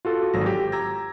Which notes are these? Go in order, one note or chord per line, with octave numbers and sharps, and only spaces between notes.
F4 F#4 A4
G#1 F#3 A#6
G4
A#5 E6 G#6 A#6